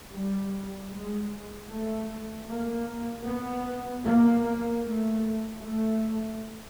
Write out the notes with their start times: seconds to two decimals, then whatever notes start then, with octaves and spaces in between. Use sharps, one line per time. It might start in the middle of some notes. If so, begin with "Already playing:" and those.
0.13 G3
0.91 G#3
1.69 A3
2.48 A#3
3.26 B3
4.05 A#3
4.83 A3
5.61 A3